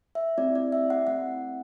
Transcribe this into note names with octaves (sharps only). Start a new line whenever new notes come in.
E5
A3 C4 E4 G4 D5
D5
E5
F#5
A3 C4 E4 F#5